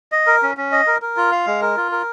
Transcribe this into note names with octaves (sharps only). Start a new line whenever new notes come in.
D#5
A#4
C#4
C#4
D#5
A#4
A#4
F4
F5
G#3
A#4
F4
A#4